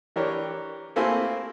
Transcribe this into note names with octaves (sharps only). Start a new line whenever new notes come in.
E3 D4 G4 A#4 C#5
A3 A#3 C4 E4 C5 G#5